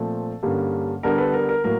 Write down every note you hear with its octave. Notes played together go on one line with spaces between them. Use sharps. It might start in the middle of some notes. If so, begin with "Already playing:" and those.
Already playing: A#2 F3 A3 C4 A4
G2 D3 G3 A#3 C#4
D3 G3 B3 D4 A#4
A4 B4
A#4
A#4
A2 F#3 A#3 A#4